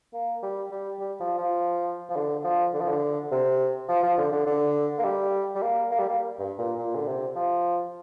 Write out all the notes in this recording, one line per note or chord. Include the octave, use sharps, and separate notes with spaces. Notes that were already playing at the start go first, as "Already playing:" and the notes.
A#3
G3
G3
G3
F3
F3
F3
D3
F3
D3
F3
D3
C3
F3
F3
D3
D3
D3
A#3
G3
G3
A#3
A#3
G3
A#3
G2
A#2
A#2
D3
C3
F3